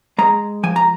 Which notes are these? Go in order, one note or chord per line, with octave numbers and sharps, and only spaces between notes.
G#3 A#5
F3 G#5
A#5